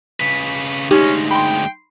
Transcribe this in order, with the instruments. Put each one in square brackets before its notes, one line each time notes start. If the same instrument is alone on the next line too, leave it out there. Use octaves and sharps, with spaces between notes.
[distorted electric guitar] C#3 B4 [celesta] B6
[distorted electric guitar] D2 G#3 [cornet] C#4 [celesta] D#4 [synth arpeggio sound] G4
[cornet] G5 [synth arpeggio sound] B5 C6